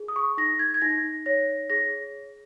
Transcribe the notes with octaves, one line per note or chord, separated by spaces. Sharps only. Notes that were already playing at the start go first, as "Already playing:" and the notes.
Already playing: G#4
D#6
C#6
D#4 A#6
G#6
G#6
D#4 A#6
C#5 A#6
G#4 A#6